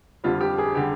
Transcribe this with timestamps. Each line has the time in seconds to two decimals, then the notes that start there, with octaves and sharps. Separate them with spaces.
0.24 F2 D3 G3 F4
0.41 G4
0.58 G#4
0.74 D3 G3 G4